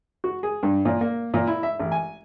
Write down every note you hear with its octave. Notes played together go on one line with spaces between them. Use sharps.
F#4
G#4
G2
A#2
A#3
A#2
E4
E5
A1
G#5